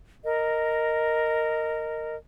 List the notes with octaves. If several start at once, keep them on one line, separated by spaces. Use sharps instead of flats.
A#4 D#5